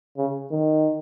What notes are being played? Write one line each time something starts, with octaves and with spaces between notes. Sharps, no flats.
C#3
D#3